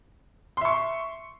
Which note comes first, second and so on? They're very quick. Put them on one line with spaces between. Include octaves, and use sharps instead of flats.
C6 E5 C#6